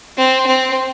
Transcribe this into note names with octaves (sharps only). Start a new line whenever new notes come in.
C4
C4